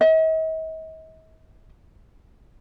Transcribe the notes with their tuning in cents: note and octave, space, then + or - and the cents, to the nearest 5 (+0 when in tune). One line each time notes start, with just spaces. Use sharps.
D#5 +45